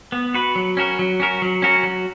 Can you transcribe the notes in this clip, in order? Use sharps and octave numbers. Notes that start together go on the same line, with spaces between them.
B3
F#4 B4
F#3
C#4 F#4 A#4
F#3
C#4 F#4 A#4
F#3
C#4 F#4 A#4
F#3